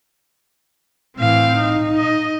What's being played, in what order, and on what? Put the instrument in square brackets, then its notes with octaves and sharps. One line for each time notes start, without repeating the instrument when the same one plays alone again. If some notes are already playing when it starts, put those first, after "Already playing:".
[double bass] A2 E3 [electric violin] C4 F5
[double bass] D#4
[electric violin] D#5